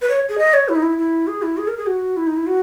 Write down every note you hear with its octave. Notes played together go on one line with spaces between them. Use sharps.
B4
C#5
G#4
D#5
C#5
E4
D#4
E4
E4
G#4
E4
G#4
A#4
G#4
F#4
E4
D#4
E4
F#4